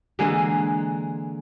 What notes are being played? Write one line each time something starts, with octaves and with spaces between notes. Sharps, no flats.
D3 E3 G#3 A#3